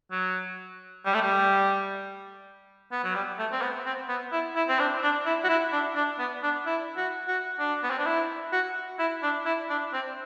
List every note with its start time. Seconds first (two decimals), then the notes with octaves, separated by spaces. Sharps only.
0.12 F#3
1.05 G3
1.14 A3
1.22 G3
2.92 B3
3.04 F#3
3.15 G3
3.39 A3
3.51 C4
3.62 B3
3.85 C4
4.09 B3
4.32 E4
4.56 E4
4.68 C4
4.79 D4
5.02 D4
5.26 E4
5.44 F#4
5.49 E4
5.72 D4
5.96 D4
6.19 B3
6.43 D4
6.66 E4
6.97 F#4
7.28 F#4
7.59 D4
7.83 B3
7.90 C4
7.98 D4
8.06 E4
8.53 F#4
8.99 E4
9.23 D4
9.46 E4
9.69 D4
9.93 C4